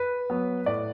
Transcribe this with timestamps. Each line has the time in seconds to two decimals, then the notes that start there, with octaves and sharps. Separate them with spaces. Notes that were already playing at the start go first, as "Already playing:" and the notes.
Already playing: B4
0.30 F#3 B3
0.66 A2 D5